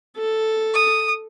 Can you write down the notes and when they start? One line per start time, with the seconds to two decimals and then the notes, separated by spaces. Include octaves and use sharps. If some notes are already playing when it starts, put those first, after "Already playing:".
0.17 A4
0.74 D#6